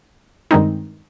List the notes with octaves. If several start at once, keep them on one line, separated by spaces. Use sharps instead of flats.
G2 D#3 G#3 C4 D#4